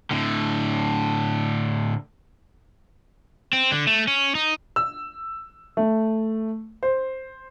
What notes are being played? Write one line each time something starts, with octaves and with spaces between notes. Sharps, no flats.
A2 D3
C4
D3
A3
C#4
D#4
E6
A3
C5